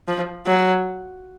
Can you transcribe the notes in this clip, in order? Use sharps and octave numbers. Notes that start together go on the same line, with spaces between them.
F3
F#3